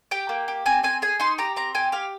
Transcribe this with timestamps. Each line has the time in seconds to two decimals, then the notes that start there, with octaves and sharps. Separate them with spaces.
0.11 G4 G5
0.29 A#3
0.48 G4
0.66 C4 G#5
0.83 C4 G#5
1.02 G#4 G#5
1.20 D#4 C6
1.38 G4 A#5
1.56 C4 A#5
1.75 G4 G#5
1.92 G4 F5